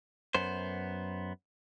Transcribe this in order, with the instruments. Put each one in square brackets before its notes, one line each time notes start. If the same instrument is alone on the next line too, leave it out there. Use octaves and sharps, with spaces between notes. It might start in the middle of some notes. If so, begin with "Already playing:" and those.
[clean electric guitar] F#2 B3 C5